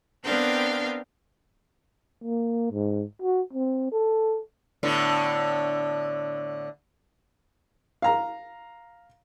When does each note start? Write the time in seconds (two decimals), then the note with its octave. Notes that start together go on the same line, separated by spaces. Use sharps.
0.24 B3 C4 D4 A#4 F5 G5
2.24 A#3
2.72 G#2
3.22 F#4
3.53 C4
3.92 A4
4.83 A2 D3 B3
8.02 F5 A#5